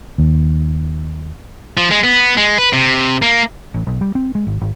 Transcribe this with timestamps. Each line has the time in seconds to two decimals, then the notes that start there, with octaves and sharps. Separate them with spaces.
0.18 D#2
1.77 F3
1.91 G#3
2.04 B3
2.37 G#3
2.58 B4
2.73 C3
3.22 A#3
3.74 A1
3.87 B1
4.01 G3
4.15 C4
4.35 G#3
4.47 G#1
4.61 G#1